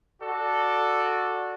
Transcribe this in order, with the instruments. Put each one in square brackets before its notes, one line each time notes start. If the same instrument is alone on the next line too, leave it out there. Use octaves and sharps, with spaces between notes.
[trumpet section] F#4 A4 D5